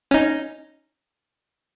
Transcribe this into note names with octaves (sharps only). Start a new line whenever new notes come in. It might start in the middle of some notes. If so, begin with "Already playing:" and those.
C#4 D#4